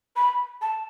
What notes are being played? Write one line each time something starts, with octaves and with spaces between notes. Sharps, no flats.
B5
A5